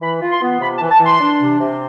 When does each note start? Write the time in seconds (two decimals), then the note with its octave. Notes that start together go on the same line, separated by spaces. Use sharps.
0.01 E3 B5
0.22 F4
0.31 C6
0.42 B3
0.61 C3 B5
0.76 A5
0.81 E3
0.91 A5
1.00 E3
1.05 C6
1.21 D4
1.40 C3
1.60 C3